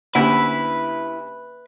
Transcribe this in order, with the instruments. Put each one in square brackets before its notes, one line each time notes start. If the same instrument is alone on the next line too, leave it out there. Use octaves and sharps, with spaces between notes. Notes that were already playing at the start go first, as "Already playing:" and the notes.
[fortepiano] D2 C#4 G4 [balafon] A#3 F#5 B5 [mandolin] E4 [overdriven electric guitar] B4